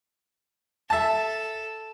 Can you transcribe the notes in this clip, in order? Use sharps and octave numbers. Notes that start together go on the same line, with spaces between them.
A4 E5 A5